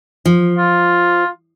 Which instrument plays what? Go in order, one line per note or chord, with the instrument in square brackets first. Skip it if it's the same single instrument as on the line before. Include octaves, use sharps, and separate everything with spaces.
[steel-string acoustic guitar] F3
[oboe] F4